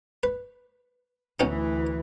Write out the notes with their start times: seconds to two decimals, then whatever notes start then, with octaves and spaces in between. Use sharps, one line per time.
0.23 B4
1.40 D2 B2 E3 C#4 D#4